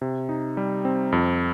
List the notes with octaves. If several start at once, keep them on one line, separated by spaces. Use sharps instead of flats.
C3
D#4
G3
C4
F2